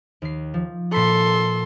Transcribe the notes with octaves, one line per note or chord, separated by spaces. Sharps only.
D#2 C7
F3
A#2 A4 B5 C6 C#7